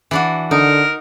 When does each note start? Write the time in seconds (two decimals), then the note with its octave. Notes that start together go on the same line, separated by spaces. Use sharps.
0.11 E3 D4 F#4
0.51 D3 D#4 A#4